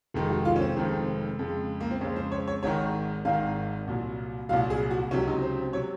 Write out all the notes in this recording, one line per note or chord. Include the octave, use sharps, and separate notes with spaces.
F1 F2 D#3 G#3
F#4
F4
C#4
C4
F1 F2 D#3 G#3
F2 C#3 G#3
A#3
C4
F2 C#3 G#3 C#4
C5
C#5
C#5
G#1 G#2 D#3 C#5
G#1 G#2 D#3 F5
C2 A#2 F#3
C2 A#2 F#3 F5
G#4
F#4
C#2 C3 F#3 C#4
D#4
C5
C3 F#3 C#5